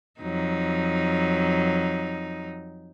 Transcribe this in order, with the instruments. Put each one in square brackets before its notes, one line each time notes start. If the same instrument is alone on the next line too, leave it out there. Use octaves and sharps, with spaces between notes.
[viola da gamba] F2 F#3 D#4